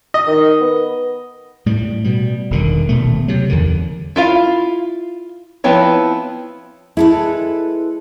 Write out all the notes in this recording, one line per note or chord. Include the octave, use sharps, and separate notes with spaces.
D#5
D#3
B3
A2 G3
B2 G3
E1 D3 D#3
D#1 B2 A3
C3 F#3
E2 D3 D#3
E4 F4 F5
F3 B3 C4 E4 C#5
G#3 E4 A4 B4